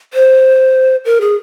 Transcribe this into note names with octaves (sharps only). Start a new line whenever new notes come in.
C5
A#4
G#4